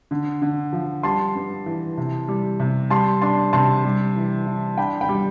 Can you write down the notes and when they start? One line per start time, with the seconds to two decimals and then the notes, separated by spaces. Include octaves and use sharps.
0.11 D3
0.42 D3
0.73 F3
1.03 G3 A5 C6
1.35 G2
1.66 E3
1.97 C3
2.28 G3
2.60 C3
2.90 G3 A5 C6
3.21 D4 A5 C6
3.53 C3 A5 C6
3.85 G3
4.16 E3
4.47 E3
4.78 D4 G5 B5
5.01 G5 B5
5.09 G3